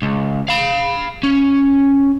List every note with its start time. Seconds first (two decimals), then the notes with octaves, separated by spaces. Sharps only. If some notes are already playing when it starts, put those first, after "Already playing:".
0.03 C#2
0.49 F5 B5
1.23 C#4